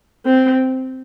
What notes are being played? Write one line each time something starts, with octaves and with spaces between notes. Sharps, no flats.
C4